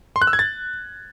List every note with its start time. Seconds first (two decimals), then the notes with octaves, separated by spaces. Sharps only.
0.16 C6
0.22 F#6
0.27 E6
0.33 G#6
0.39 A6